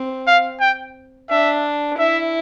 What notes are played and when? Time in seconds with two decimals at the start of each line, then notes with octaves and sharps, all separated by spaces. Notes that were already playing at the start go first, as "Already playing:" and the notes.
Already playing: C4
0.27 F5
0.61 G5
1.30 D4 E5
1.99 E4 E5